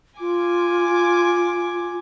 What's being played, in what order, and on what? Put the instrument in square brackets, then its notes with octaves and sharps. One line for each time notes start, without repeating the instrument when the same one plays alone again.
[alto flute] F4 [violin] G#5 D6